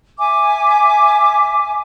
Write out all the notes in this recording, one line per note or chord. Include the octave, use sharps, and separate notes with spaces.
E5 G#5 D6